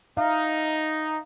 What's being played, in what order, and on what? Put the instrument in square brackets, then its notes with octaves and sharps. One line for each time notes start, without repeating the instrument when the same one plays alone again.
[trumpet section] D#4 [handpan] E5 F5